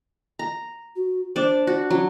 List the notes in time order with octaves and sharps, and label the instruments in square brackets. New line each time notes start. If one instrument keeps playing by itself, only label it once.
[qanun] A#5
[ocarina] F#4
[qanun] D4 D5 [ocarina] C5
[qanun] F#4
[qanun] F#3 [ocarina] C#4